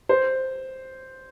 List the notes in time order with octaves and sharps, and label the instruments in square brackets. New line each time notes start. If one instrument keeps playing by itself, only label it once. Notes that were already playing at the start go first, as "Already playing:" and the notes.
[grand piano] C5